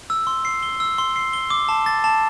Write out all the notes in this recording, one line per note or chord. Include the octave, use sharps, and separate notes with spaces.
E6
C6
C7
G7
E6
C6
C7
G7
D6
A5
A6
A5